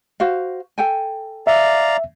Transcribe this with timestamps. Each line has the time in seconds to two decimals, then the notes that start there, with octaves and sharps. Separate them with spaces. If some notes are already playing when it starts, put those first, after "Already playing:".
0.20 F#4 C5 F5
0.78 A4 G5 G#5
1.47 D5 E5 F5 A#5